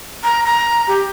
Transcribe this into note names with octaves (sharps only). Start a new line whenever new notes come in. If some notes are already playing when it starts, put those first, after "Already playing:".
A#5
A#5
G4